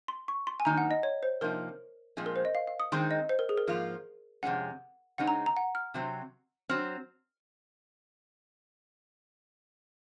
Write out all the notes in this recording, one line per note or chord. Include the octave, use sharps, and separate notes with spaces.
C6
C#6
C6
G#5
D#3 F#3 A#3 D#4 A#5
F#5
D#5
C#5
C5
C3 F3 A#3 D#4 A#4
A#2 F3 G#3 C4
A#4
C5
D#5
F5
F5
D#6
D#3 G#3 C4 D#4 C6
D#5
C5
A#4
G#4
A#4
G#2 F3 A#3 F4
F2 C3 D#3 G#3 C#4 F#5
C#3 G#3 C4 D#4 F#5
A#5
A#5
F#5
F6
C3 F#3 C4
F#3 C4 F6